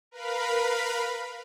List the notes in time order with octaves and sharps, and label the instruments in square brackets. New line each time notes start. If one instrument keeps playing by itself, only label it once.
[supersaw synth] A#4 B4 F5 B5